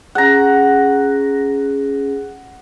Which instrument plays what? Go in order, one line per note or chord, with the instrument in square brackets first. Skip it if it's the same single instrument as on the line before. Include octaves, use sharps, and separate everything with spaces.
[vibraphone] C#4 G#4 [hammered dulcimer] F#5 A#5